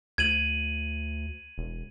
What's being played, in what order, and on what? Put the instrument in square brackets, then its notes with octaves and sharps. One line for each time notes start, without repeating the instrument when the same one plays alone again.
[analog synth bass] D2 [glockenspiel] G#6 D#7 F#7
[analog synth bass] E1